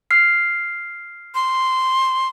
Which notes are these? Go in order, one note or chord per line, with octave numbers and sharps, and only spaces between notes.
F6 C7
C6